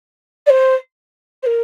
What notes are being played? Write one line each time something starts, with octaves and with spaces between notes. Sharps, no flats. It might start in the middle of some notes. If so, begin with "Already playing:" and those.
D5
C5
C5
A#4